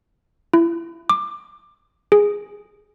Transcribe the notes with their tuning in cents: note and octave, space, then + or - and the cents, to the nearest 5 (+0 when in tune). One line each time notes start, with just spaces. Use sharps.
E4 +25
D6 +15
G#4 -5